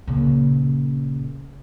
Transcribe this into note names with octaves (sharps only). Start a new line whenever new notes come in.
A#2 C#3